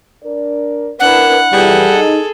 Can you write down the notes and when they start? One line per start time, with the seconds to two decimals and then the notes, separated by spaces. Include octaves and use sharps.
0.23 D4 A#4 D5
1.00 D4 E4 A#4 B4 F#5
1.53 F2 B2 E3 G3 G#4 A4
1.91 D#4